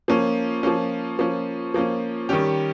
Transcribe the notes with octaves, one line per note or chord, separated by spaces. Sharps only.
F3 A#3 C#4
F3 A#3 C#4
F3 A#3 C#4
F3 A#3 C#4
D#3 G3 C#4 G4